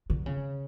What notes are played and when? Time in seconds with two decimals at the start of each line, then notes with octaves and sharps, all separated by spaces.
0.10 D3
0.26 C#3